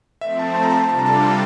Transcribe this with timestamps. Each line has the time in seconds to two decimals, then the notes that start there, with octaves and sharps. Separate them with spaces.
0.21 F3 A3 C4 E5
0.39 A5
0.55 A5
0.63 A#5
0.70 A5
0.89 C3 G3 D4 F4 A4 A5
0.99 A#5
1.06 A5
1.23 G5